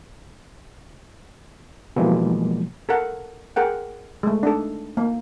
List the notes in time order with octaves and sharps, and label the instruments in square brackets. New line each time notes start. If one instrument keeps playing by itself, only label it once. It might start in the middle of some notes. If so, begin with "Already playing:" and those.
[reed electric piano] B2 E3 F3 G3 G#3 A#3
[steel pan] A4 A#4 F#5
G#4 A#4 F#5 G5
G#3 A3
D4 D#4 A4
A#3